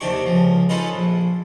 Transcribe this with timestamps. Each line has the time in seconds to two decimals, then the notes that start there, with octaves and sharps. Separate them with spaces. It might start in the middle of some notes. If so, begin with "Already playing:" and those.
0.01 D#2 C3 D#3 D4 G4 C#6
0.26 C#2 F3
0.69 C#4 D#4 F4 A4 B4 D#5
0.93 A#1